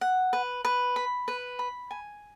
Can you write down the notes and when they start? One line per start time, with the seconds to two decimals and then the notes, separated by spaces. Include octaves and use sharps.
0.01 F#5
0.33 B4
0.65 B4
0.96 B5
1.28 B4
1.59 B5
1.91 G#5